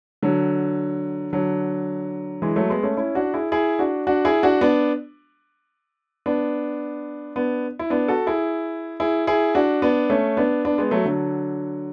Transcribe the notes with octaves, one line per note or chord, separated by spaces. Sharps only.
D3 F#3
D3 F#3
E3 G#3
F#3 A3
G#3 B3
A3 C#4
C#4 E4
D4 F#4
E4 G#4
E4 G#4
D4 F#4
D4 F#4
E4 G#4
D4 F#4
B3 D4
B3 D4
B3 D4
E4
B3 D4
F#4 A4
E4 G#4
E4 G#4
E4 G#4
D4 F#4
B3 D4
A3 C#4
B3 D4
B3 D4
G#3 B3
F#3 A3
D3 F#3